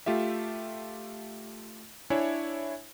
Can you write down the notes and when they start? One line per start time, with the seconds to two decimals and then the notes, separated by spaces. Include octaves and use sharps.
0.06 A3 F4 G4 E5
2.10 D4 E4 C#5 E5 G#5